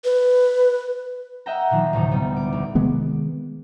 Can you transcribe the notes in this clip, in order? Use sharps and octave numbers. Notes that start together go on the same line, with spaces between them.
B4
D#5 E5 F#5 G5 A#5
A#2 D#3 F3
D2 A2 C3 D#4
G3 B3
D6
B1
C3 D#3 G#3 B3